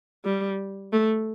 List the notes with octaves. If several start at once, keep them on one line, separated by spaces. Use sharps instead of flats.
G3
A3